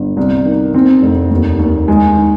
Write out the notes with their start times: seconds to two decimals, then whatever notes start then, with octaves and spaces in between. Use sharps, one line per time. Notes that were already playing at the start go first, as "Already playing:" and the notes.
Already playing: G1
0.17 C2
0.45 D#3
0.73 D#3 C4
1.02 F1
1.31 D#2
1.59 D#2
1.88 D#3 G#3
2.16 D#3